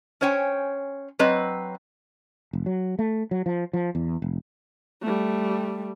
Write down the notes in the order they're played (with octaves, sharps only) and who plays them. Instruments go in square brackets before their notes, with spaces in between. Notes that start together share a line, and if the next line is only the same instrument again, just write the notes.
[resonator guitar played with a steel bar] C#4 C5 C#5 G5 G#5
F#3 C4 B4 D#5
[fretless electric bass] F1
F#3
A3
F#3
F3
F3
E2
F1
[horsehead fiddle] G3 A3